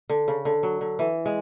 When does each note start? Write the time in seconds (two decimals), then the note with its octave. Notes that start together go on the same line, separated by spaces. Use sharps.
0.10 D3
0.28 C#3
0.45 D3
0.63 F#3
0.81 D3
0.99 E3
1.26 G#3